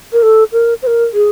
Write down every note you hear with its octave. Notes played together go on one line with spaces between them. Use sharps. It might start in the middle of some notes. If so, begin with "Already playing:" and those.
A#4
A4
A#4
C5
A#4
G#4